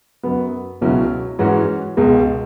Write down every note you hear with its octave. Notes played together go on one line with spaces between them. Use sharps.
F#2 F#3 B3
C#2 B2 F#3 C#4 E4
G#2 E3 C#4 F#4
C#2 B2 G#3